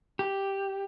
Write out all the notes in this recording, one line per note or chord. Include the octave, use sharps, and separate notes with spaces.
G4